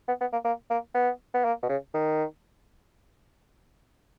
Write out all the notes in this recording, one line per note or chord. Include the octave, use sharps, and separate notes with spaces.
B3
B3
A#3
A#3
A#3
B3
B3
A#3
B2
C#3
D#3